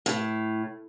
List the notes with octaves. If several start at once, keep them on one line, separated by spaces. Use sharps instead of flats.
A2